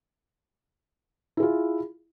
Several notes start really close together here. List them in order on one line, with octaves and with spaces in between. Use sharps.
E4 G#4 F4